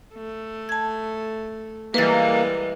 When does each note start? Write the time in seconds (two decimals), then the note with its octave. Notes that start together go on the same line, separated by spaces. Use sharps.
0.14 A3
0.69 A5 G#6
1.94 E3 G3 G#3 A#3 B4 A6